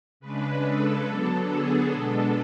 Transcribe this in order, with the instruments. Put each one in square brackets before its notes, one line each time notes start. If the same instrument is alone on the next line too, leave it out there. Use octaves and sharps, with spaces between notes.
[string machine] C#3 G#3 D4 B4
A4
D3 F#3 B3 D4
G#4
B2 G#3 B3 D4 A4